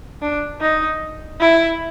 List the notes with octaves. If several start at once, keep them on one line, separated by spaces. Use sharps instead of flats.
D4
D#4
E4